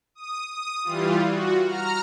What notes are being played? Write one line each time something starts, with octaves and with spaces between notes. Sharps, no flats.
D#6
D#6
E3 G3 F4
F#4
A#5 F6